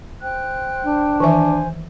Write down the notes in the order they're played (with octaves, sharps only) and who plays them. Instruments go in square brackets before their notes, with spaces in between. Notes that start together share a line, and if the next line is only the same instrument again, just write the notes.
[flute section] C5 G5 F#6
[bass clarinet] D4
[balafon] D#3 E3 E5 [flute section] C5 G#5